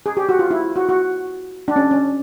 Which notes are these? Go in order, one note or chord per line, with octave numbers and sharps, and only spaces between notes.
G#4
G4
F#4
F4
E4
F#4
F#4
D4
C#4
C#4